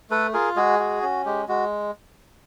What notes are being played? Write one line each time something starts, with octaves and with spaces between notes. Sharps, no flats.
A3 A4 B4
F4 G#4 A#4
G#3 F#4 G#4
F#4
C#4
G#3 G4
G#3 F#4